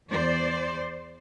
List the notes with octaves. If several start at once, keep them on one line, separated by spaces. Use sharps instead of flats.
E2 C5 D5